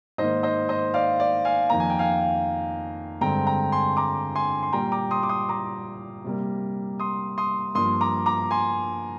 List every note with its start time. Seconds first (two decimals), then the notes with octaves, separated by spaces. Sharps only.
0.18 G#2 D#3 A#3 C5 D#5
0.43 C5 D#5
0.69 C5 D#5
0.94 D5 F5
1.20 D5
1.45 F5 G#5
1.70 F2 D#3 A#3 A#5
1.80 G#5
1.90 G5
1.99 F5 G#5
3.21 G2 D3 G#3 C4 G5 A#5
3.47 G5 A#5
3.72 G#5 C6
3.97 A#5 D6
4.35 G#5 C6
4.63 C6
4.72 A#2 G3 A#3 G5 A#5
4.92 A#5 D6
5.11 C6 D#6
5.23 D6
5.29 C6 D#6
5.49 A#5 D6
6.24 C3 G3 A#3
7.00 C6 D#6
7.38 C6 D#6
7.75 G2 F3 A#3 C6 D#6
8.01 A#5 D6
8.26 A#5 D6
8.51 G#5 C6